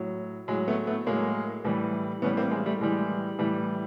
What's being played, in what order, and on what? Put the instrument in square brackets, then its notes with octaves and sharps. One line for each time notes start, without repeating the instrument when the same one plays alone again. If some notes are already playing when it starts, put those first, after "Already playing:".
Already playing: [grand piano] A2 F#3
A2 F#3 G#3
A3 B3
A3 B3
A2 F#3 G#3 A#3
A2 E3 G3
A2 E3 G3 B3 C#4
A#3 C4
G#3 A#3
G3 A3
A2 E3 G3 G#3
A2 E3 G3